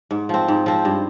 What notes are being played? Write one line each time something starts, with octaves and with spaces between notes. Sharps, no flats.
G#2
F3 C4
G#2
F3 C4
G2